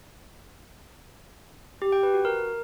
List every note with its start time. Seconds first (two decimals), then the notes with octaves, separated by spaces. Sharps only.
1.82 G4
1.92 G5
2.03 B4
2.14 F#4
2.25 A#4